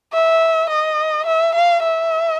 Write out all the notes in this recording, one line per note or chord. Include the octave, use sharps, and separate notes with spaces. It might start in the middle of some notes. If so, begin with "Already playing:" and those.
E5
D#5
E5
F5
E5